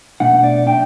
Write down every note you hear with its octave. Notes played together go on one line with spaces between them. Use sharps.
B2 A3 D4 F#5
D5
A3 D4 G5